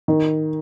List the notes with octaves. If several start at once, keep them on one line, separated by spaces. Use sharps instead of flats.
D#3